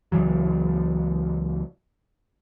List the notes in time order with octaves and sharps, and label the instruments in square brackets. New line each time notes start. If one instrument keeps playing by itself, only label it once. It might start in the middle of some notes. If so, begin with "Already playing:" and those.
[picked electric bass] C#2 C#3 E3 F#3